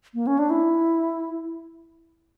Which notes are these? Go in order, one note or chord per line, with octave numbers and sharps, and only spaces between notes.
A#3
C#4
D4
E4